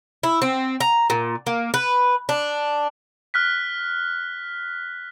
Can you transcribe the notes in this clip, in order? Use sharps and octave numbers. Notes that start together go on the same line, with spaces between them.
E4
C4
A#5
A#2
A#3
B4
D4
F6 F#6 B6